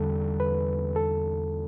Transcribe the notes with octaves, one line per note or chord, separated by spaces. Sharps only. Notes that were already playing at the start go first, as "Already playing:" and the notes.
Already playing: E2 D3 G3 A4
B4
A4